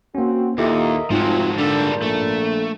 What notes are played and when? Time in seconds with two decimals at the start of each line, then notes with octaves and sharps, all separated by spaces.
0.15 A#3 C4 C#4 F#4
0.58 D#2 A#2 E4 G4 A4 A#4 D#5 E5
1.10 F1 G#2 F3 F#3 C4 F4
1.58 C#2 A#2 D3 G3 A4
2.02 A#1 A3